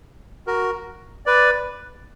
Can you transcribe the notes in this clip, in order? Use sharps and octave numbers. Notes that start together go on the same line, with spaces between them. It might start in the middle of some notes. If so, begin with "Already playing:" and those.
F#4 A#4
B4 D5